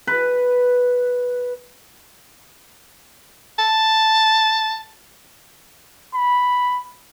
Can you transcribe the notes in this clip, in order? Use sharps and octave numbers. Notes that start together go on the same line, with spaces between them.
B4
A5
B5